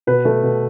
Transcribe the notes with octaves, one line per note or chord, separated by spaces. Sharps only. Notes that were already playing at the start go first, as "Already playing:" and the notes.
B2 B4
A3
B2